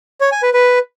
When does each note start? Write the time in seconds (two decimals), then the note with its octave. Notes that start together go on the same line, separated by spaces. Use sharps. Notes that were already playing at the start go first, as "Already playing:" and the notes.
0.21 C#5
0.32 G#5
0.43 B4
0.54 B4